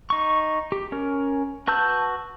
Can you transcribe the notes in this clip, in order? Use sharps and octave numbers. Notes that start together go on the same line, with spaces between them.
D#4 C#6
G4
C#4 A#4
F#4 B4 A5 E6 G6